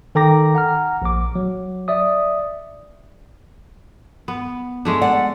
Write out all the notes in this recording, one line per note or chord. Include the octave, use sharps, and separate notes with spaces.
D#3 A4 G5 A#5 D6 A#6
F#5 A#5 F6
A#1 D6
F#3
D5 E5 D#6
B3
G#3 A3 D4
D5 F#5